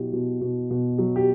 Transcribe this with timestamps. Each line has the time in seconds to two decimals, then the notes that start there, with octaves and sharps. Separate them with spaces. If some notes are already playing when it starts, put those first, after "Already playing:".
Already playing: B2 F#3 E4 G4
0.13 B2
0.41 B2
0.70 B2
0.98 F#3
1.16 G4